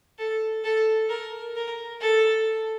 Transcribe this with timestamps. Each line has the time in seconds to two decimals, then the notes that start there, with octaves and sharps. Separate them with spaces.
0.19 A4
0.64 A4
1.10 A#4
1.56 A#4
2.01 A4